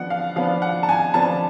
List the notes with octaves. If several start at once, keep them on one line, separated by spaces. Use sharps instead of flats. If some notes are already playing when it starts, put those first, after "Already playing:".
Already playing: F3 B3 D4 F#5
F5
F3 B3 D4 F5
F#5
A5
G#5
F3 B3 D4 A5